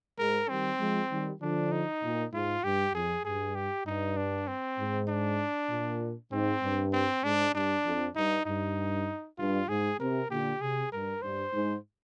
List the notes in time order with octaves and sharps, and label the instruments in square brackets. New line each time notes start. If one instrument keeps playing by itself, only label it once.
[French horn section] G#2 [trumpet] A#4
[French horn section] D#3 G3 [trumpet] C4
[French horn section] F3 G#3
D#3 G3
[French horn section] D3 F3 [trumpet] D4
[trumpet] D#4
[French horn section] A#2
[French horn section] G#2 [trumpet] F4
[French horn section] G2 [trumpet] G4
[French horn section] F2 [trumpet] G#4
[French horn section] G2 [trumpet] G#4
[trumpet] G4
[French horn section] G2 [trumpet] D#4
[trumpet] D4
C4
[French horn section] G#2
[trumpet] D4
[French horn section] A#2
[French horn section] G#2 [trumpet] C4
[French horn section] G2
[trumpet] C4
[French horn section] G#2 [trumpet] D4
[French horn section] G2 [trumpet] D4
[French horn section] F2
[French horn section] G2 [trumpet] D#4
[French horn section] G2 [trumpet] D#4
[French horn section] G2 [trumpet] F4
[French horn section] G#2 [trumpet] G#4
[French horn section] C3 [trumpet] A#4
[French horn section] A#2 D3 [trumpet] G4
[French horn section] C3 [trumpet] G#4
[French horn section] G2 [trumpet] A#4
[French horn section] G2 [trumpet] C5
[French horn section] G#2